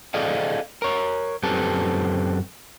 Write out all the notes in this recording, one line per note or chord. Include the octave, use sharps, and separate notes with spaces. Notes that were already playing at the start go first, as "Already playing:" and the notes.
G#4 A4 D5 D#5 F5
A#4 C#5
F#2 C4 G4 A4 B4 A5